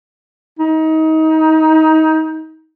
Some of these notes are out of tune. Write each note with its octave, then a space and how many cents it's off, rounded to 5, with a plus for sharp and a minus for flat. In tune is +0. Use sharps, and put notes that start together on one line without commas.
D#4 +25